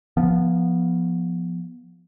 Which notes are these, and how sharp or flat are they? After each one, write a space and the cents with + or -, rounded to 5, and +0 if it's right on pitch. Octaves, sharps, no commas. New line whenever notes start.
F3 +0 B3 -15